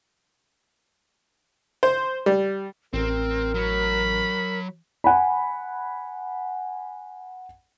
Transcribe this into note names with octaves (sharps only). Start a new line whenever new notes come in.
C5
G3
A1 C4 A#4
F#3 B5
F#5 G#5 B5